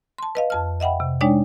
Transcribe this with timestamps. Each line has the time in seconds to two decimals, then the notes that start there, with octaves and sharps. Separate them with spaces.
0.18 A5 C6
0.35 B4 D#5 F5
0.50 F2 A5 F6
0.80 D#5 E5 F#5 G5 B5
1.00 C3
1.21 G#3 D4 D#4 C#5 D5 G5